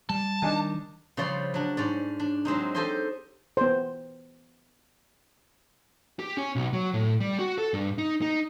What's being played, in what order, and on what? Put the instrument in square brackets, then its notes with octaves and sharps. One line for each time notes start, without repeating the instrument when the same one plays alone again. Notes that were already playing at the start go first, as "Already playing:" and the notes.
[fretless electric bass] G3 [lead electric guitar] A5
[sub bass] D#3 [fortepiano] D4 D#4 G#5
[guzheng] C#3 F3 G3 C#5 D5 C6
F#3 D4
G#2 C#4 D5
D4
F#3 G#3 C4 D#4
G4 A4 C5 D#5 G#5 C6
[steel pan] B3 C5
[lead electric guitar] G4
C#4
B1
F#3
A2
G3
F#4
A4
G2
D#4
D#4